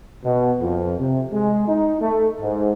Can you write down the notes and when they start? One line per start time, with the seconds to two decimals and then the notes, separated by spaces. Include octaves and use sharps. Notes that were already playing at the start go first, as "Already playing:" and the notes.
0.24 B2
0.61 F2
0.99 C3
1.33 G#3
1.68 D#4
2.01 A3
2.41 G#2